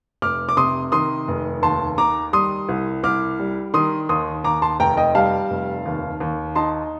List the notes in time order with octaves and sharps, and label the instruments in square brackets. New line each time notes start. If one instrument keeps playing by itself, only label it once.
[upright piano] F1 D6 F6
D6
C3 C6 D#6
D#3 C6 D#6
F1
D#2 A5 C6
D#3 A#5 D6
G3 C6 D#6
C2
C2 D6 F6
G3
D#3 C6 D#6
D#2 C6 D#6
D#2 A#5 D6
A5 C6
F1 G5 A#5
D#5 G5
G3 F5 A5
F1
D#2
D#2
D#4 A5 C6